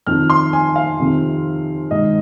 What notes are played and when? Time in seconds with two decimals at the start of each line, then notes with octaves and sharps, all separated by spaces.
0.07 F2 D#3 F6
0.30 C6
0.53 G#5
0.76 F5
0.99 F2 C3 D#3
1.91 G#2 D#3 D#5